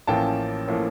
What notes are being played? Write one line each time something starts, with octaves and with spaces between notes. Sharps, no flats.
A1 A2 F3 A#3 C#4 G5 A5
A2 F3 A#3 C#4